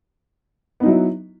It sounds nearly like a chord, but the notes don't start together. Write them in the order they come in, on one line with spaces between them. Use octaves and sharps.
B3 D#4 F#3 E4